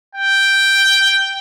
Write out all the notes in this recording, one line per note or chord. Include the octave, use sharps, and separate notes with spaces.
G5